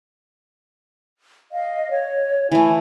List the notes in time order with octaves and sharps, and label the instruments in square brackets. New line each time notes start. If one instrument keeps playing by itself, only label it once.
[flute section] D#5 F5
C#5
[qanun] E3 A3 [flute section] E4 G#5